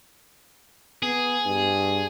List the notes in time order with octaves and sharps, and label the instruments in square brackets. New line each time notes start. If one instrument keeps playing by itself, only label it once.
[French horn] B3 [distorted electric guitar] G#4
[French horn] G2